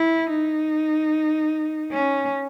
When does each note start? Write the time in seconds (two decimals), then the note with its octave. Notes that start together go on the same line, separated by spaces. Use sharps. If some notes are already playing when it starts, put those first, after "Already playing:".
Already playing: E4
0.30 D#4
1.92 C#4